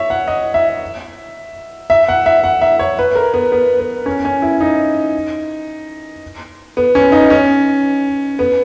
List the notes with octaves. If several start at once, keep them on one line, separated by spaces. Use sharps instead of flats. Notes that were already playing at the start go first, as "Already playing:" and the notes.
Already playing: C#5 E5
F#5
D#5
E5
E5
F#5
E5
F#5
E5
C#5
B4
A#4
B3
B3
B3
C#4
C#4
E4
D#4
B3
C#4
D#4
C#4
B3